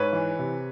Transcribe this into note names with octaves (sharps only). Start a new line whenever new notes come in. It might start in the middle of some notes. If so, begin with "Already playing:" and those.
Already playing: G#2 B4 C#5
E3
C3